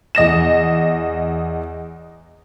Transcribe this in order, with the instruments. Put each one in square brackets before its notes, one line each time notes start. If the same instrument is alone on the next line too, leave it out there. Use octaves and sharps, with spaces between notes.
[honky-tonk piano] E2 D#5 A#6 E7